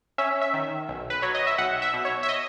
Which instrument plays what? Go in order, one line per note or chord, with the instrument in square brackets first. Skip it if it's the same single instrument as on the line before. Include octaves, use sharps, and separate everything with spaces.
[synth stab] C#4 E5
E5
D#3
B1
B4
F#3 C#5
D#5
E5
B1 F#5
E5
B2
C#5
E5
D#5